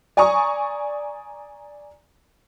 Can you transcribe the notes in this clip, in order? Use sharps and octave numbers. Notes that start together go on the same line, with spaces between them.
D5 G#5 A#5 C#6 D#6